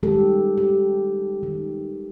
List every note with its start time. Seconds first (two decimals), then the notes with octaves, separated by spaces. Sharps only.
0.03 D#3 G3 G#3 C#4 G4 A4
0.58 G4
1.43 D#3